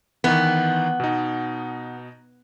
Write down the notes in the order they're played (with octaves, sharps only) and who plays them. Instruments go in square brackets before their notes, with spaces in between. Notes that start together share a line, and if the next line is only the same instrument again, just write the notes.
[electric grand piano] D#3 E3 [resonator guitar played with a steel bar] B3
[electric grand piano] B2 D#4